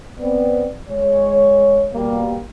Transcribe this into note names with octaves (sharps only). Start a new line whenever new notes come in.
B3 C4 D5
G#3 C#5
B2 G3 A#3